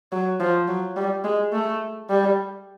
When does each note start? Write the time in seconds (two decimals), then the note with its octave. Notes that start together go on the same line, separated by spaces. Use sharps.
0.12 F#3
0.40 F3
0.68 F#3
0.96 G3
1.24 G#3
1.53 A3
2.09 G3